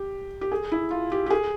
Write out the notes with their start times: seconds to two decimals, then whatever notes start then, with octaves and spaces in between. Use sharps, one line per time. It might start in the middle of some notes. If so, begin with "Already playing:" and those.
Already playing: G4
0.41 G4
0.52 G#4
0.72 E4
0.91 F4
1.12 G4
1.26 G4
1.30 G#4